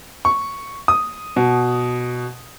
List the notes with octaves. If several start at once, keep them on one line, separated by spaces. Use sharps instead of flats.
C#6
D#6
B2